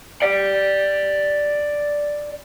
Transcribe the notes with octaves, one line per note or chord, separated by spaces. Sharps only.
D5 G5